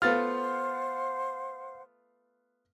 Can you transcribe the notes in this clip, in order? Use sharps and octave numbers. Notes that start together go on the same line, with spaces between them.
A3 B3 F4 C5 F5 F#5 F6 A6